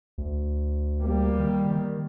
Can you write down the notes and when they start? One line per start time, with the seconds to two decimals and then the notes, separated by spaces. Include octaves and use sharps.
0.18 D2
1.01 G3 A#3
1.40 D#3
1.71 D#3